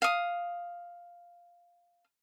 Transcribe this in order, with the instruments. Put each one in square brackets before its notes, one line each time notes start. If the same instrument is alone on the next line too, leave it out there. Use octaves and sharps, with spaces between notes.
[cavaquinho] F5 D#6